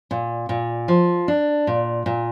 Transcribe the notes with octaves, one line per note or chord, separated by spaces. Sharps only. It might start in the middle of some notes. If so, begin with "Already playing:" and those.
A#2
A#2
F3
D4
A#2
A#2